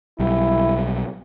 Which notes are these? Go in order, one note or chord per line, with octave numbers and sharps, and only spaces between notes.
B1 G3 E4